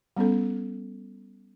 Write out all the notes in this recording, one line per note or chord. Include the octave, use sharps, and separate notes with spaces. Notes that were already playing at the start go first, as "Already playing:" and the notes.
G3 B3 C#4 A4